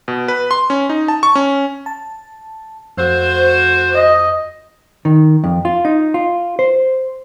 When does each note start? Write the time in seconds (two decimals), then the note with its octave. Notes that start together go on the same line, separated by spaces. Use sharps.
0.08 B2
0.28 B4
0.51 C6
0.70 C#4
0.89 D#4
1.08 A5
1.23 C#6
1.35 C#4
1.86 A5
2.97 F2 A3 F#4 C5
3.93 D#5
5.05 D#3
5.44 F2
5.65 F4
5.85 D#4
6.14 F4
6.59 C5